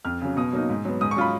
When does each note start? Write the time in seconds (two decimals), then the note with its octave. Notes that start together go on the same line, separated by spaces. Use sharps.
0.05 F2 F6
0.22 C#3 F#3
0.37 B2 D#6
0.53 F#3 A#3 D#4
0.70 G#2
0.85 F#3 B3
1.01 G#2 D#6
1.11 C#6
1.16 F#3 C#4 F4 B5